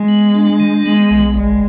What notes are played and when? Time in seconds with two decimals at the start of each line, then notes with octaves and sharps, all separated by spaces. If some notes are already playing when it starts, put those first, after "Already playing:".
Already playing: G#3
0.09 B3
0.35 D4
0.60 D#3
0.85 G#3 B3
1.11 B1
1.36 G1 G#3